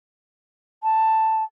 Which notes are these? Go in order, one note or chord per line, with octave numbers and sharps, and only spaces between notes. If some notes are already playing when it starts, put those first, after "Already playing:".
A5